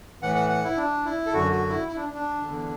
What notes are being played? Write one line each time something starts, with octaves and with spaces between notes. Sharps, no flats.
A2 E3 F#5
F#5
F#5
E4
D4
E4
A4
F#2 D3 F#4
F#4
E4
E4
D4
D4
E2 D3